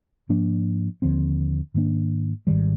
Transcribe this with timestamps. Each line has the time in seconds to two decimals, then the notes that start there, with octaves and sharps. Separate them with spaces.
0.29 G#2 F3 A#3 D4
1.02 D#2 D3 F3 C4
1.74 G#2 D#3 A#3 D4
2.47 G#1 G#2 D#3 G3